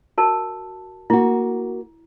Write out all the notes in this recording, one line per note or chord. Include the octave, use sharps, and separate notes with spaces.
F#4 A#4 A5
A#3 E4 F#4